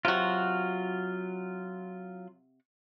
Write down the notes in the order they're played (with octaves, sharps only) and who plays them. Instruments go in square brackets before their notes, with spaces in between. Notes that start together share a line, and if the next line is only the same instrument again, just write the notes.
[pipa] C3 F#4 [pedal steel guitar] F#3 F4